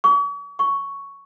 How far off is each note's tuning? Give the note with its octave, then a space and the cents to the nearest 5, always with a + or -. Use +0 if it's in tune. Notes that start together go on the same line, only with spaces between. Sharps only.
C#6 +45
C#6 +5